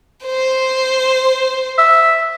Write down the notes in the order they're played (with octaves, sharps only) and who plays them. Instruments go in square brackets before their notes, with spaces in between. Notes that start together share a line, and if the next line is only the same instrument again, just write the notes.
[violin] C5
[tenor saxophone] E5